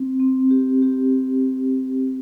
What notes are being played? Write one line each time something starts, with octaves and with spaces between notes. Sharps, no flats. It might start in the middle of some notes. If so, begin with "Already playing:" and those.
Already playing: C4
C4
G4
G4